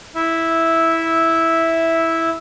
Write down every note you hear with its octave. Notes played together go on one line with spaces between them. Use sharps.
E4 E5